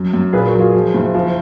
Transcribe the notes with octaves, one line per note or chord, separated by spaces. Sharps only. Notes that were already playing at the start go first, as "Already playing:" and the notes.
Already playing: F#2
F#2
A#2 G#4 B4
F#4 A#4
F#3
F4 G#4
F3
F#1
F3